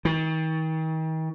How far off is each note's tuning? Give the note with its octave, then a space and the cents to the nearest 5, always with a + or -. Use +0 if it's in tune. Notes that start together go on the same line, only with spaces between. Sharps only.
D#3 +40